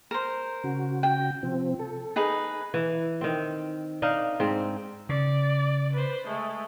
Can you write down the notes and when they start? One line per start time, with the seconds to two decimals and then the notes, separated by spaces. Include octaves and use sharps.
0.11 A#4 C5
0.64 C#3 F#4
1.03 G5
1.43 C3 F3 C4
1.79 A4
2.16 D#4 G#4 B4
2.74 E3
3.21 D#3 C4
4.02 D4 D#4 F5
4.40 G#2 C4
5.09 C#3 D5
5.92 B4 C5
6.27 G#3 A3